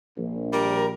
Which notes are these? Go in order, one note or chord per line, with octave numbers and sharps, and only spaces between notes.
A#1
G3 A#4